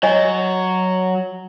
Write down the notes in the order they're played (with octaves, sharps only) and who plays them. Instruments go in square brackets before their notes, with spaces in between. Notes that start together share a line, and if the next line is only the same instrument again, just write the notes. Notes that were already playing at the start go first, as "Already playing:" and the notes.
[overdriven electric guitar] F#3 [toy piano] C#5 D#5 G#5